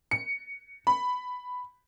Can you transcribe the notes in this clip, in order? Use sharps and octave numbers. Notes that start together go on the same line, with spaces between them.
C#7
B5